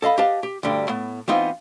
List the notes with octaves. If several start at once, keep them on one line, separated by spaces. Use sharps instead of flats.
A4 D#5 F5 B5
G4 B4 D#5 F5 A5
G4
D2 G2 D3 G3
A2 B3
E3 B3 C4 D#4 F4